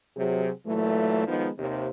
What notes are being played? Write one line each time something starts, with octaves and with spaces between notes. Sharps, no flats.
C3 F#3 G#4
A#2 E3 F#3 A3
D#3 F3 G#3 B3 D#4
D#2 C3